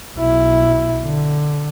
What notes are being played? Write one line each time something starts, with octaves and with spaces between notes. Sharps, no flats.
B1 E4
D3